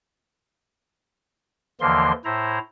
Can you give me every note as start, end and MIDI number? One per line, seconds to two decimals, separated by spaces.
1.81 2.12 39
1.81 2.12 50
1.81 2.12 52
1.81 2.12 53
1.81 2.12 58
1.81 2.12 84
2.25 2.58 45
2.25 2.58 64
2.25 2.58 72
2.25 2.58 82